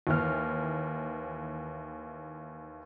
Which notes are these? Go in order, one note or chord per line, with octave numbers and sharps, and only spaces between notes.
D#2 E3 F6